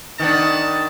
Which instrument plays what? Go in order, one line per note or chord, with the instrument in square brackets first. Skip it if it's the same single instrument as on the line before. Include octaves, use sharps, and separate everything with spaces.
[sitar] D#3 B3 D4 [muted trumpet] A5